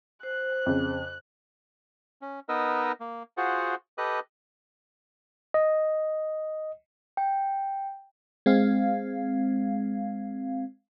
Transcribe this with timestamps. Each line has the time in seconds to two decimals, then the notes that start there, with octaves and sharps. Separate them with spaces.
0.23 C5 F#6
0.66 F2 C#3
2.22 C#4
2.49 B3 D#4 A#4 B4 D#5 E6
3.00 A#3
3.37 F4 F#4 G#4 C5 F#5
3.98 G4 A4 B4 D#5 D#6 F#6
5.54 D#5
7.17 G5
8.46 G#3 C4 F5